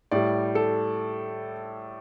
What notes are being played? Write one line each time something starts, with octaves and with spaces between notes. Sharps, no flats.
A2 G3 D5
A4